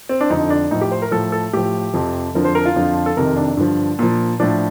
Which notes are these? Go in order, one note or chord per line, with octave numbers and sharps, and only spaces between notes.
C4
D4
F2 D3 F3 D#4
D4
A2 F3 D#4
G4
C5
A#4
A2 F3 A4
A4
A2 F3 G4
F2 C3 F3
F2 D3 F3 A#4
C5
A#4
F4
F2 D3 F3
A4
F2 C3 D#3 A#4
D4
G2 D3 F3
A#2 F3
A2 F3 D4